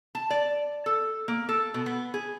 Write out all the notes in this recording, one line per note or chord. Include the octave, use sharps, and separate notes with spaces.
A5
D5
A4
A#3
A4
B2
B3
G#4